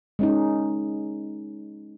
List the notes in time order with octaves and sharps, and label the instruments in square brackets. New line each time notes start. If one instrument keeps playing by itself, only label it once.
[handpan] G#3 C#4 D#4